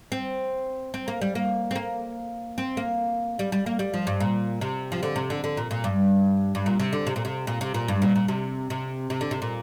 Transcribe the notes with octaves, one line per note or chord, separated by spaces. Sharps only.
C4
C4
A#3
G3
A#3
C4
A#3
C4
A#3
G3
G3
A#3
G3
F3
G2
A#2
C3
F3
D3
C3
D3
D3
A#2
A#2
G2
G2
A#2
C3
D3
C3
A#2
C3
A#2
C3
A#2
G2
A#2
A#2
C3
C3
C3
D3
C3
A#2